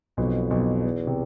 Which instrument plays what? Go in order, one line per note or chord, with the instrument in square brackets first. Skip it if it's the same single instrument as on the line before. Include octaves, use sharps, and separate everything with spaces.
[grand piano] B1 B2 [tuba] F2
[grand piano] B1 B2
[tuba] E2
[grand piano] C3